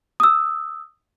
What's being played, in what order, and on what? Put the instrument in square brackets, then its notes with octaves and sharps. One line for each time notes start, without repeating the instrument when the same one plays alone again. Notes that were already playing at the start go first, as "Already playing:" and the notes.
[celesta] D#6 E6